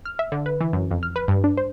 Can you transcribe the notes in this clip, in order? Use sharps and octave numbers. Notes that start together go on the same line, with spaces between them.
F6
E5
D3
B4
E3
F#2
F2
F6
B4
G2
D4
C5